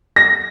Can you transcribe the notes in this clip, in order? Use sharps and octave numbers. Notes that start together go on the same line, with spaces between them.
A#6